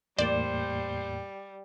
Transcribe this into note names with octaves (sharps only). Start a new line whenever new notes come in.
E2 A2 G3 A#3 C5 D5